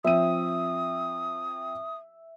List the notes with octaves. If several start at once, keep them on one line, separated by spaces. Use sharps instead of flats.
F3 C4 E5 D#6 D#7